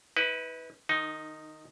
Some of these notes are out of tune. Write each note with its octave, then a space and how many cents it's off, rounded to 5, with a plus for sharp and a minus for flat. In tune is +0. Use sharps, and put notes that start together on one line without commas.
E4 -45 B4 +0
D#3 -30 D#4 +0